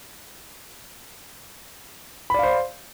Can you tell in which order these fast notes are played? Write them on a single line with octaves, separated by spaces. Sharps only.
B5 D5 F5 C5